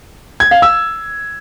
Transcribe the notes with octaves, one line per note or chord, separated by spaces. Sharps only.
G#6
F5
E6